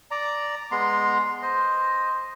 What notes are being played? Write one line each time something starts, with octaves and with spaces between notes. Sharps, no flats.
D5 A#5
G#3 B3 A#5 C6
C5 D#5